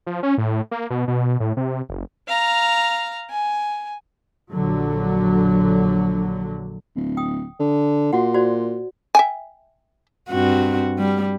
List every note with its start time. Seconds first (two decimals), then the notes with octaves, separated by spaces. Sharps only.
0.07 F3
0.23 C#4
0.38 A2
0.71 A#3
0.90 B2
1.08 B2
1.40 A2
1.57 C3
1.89 F#1
2.28 F5 A#5
3.30 G#5
4.52 A#1 D3 F#3
6.96 D1
7.17 G5 D#6
7.60 D3
8.13 A#2 F#4 F#5
8.34 F#4 C5 D5
9.15 E5 G5 G#5
10.30 G2 C4 F#4
10.98 G3